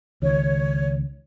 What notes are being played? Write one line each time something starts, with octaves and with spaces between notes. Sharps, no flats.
C#2 D#3 C#5